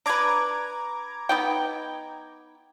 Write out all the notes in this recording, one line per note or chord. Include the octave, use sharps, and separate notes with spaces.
D4 B4 A#5 D6 G#6
B3 D#4 G5